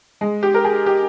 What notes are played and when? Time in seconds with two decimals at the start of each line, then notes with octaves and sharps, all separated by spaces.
0.21 G#3
0.43 G4
0.54 A#4
0.64 G#4
0.86 G4